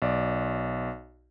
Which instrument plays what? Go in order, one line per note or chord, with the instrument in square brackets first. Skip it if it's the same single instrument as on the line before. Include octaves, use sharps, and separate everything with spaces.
[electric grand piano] B1 D5